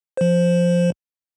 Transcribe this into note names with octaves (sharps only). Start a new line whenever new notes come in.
F3 C5